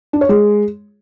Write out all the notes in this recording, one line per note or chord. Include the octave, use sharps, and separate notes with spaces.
D4
C#5
G#3